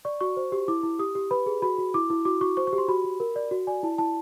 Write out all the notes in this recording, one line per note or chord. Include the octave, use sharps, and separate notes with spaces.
D5 C#6
F#4 C#6
C5
G4
E4 D6
E4
G4 D#6
G4
B4 B5
G#4
F#4 B5
F#4
E4 D6
E4
F#4 D6
F#4 C#6
C5 C#6
C#6
G4
C6
F#4 B5
F#4
A#4
D5
F#4
D5 G#5
E4 A5
E4 A5